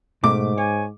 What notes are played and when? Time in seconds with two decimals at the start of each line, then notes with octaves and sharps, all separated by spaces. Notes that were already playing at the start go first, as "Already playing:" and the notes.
0.24 G#2 B2 A3 D6
0.58 C#5 G#5